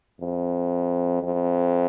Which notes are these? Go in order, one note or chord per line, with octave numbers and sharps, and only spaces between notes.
F2
F2